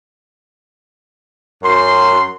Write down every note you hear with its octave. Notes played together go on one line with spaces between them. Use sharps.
F#2 C6